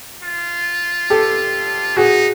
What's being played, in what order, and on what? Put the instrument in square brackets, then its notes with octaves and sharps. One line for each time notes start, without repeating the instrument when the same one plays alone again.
[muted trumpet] F4
[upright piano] G4 A4
[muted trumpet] D#4 [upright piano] F#4 G#4